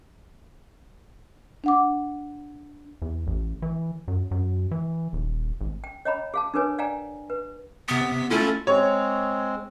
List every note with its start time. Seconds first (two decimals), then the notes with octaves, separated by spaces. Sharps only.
1.64 D4 F#5 D6
3.02 E2
3.27 A1
3.62 E3
4.08 F#2
4.31 F#2
4.71 E3
5.13 D#1
5.61 G#1
5.84 G5
6.05 C#5 D#5 G5 A#5 B5
6.34 G#4 F5 A5
6.54 D4 G#4 A#4 B4 C#5 G#5
6.78 D5 F5 G5 G#5 A#5
7.30 B4
7.88 C3 B3 B6
8.30 A3 C#4 E4 F4 A4
8.67 G#3 C4 C#5